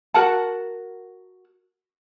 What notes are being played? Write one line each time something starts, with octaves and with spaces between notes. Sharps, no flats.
F#4 A#4 F#5 A5